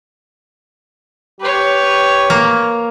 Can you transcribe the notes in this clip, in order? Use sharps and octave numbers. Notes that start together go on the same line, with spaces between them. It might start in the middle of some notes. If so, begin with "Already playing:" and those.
G4 B4 C#5
A#3